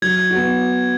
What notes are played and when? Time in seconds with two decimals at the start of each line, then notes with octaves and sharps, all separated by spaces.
0.02 F#3 G#6
0.30 B3 F#4